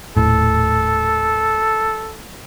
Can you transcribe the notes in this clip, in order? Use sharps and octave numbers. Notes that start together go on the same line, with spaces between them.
D#1 A2 A4